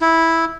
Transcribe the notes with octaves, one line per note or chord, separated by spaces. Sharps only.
E4